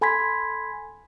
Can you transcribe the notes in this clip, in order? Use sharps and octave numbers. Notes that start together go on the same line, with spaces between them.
A4 G#5 B5 C6 G#6 B6